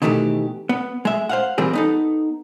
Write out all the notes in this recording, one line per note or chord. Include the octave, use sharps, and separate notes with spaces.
B2 D#3 E3 A3 G4
B3
G#3 E5
C5 F5 F#5
E3 G3 C4 F4 G#4 A#4
B3 D#4 A4